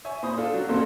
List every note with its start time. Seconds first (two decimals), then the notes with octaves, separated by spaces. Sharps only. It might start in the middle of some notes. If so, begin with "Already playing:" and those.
0.05 C#5 E5 G#5
0.23 A#2 C5 B5 D#6
0.37 D4 F4 A4
0.54 F#3
0.68 A1 A#2 A#3 C4 A4 C6